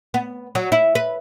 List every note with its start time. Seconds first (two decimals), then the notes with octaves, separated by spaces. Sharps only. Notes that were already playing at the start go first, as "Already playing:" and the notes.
0.14 B3
0.55 F#3
0.72 E4
0.95 B4